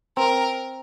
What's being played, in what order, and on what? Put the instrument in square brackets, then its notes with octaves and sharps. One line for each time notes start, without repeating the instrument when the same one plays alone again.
[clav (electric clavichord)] C4 [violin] A#4